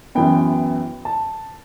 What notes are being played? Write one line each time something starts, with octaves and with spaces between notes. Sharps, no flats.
F#2 E3 B3 G5
A5